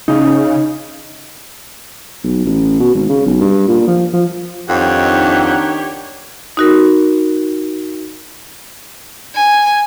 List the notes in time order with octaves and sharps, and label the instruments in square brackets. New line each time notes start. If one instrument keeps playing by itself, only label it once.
[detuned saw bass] C#3 [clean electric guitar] D#4
[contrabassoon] B1
A1
B2
G#1
C#3
B1
G2
A#2
F3
F3
[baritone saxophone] F2 [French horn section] D#3 D4 D#4 [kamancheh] G4 C#5 [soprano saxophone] F#5
[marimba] D#4 F#4 A#4
[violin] G#5